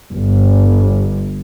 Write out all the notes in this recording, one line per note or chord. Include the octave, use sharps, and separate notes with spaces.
G1